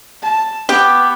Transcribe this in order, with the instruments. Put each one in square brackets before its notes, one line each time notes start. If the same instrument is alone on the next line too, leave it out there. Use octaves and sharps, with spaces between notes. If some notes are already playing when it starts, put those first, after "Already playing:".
[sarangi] A5
[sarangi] B3 [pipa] G4